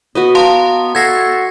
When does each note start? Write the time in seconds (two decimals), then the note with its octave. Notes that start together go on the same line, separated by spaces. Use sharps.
0.15 B3 F#4 B4 D#5
0.35 F5 A5 A#5 C6
0.95 F#4 A4 E5 F#5 G#6 A#6 C7